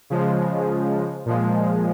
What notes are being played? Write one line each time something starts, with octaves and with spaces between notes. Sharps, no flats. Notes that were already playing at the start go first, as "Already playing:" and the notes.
C#3 F3 G#3
A#2 F3 G#3